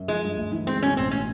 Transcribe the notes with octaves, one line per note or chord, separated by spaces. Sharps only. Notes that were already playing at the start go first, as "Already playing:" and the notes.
Already playing: F#2
F3 G#3
G2
D2
E3
G#3 C4
B2 C#4
A1 C4
A2 C#4